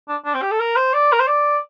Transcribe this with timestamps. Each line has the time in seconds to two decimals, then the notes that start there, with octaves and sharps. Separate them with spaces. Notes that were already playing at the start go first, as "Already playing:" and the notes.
0.08 D4
0.25 D4
0.34 C4
0.42 G4
0.51 A4
0.60 A#4
0.76 C5
0.94 D5
1.13 A#4
1.20 C5
1.27 D5